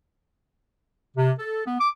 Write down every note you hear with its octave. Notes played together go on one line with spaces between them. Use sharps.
C3
A4
B3
D6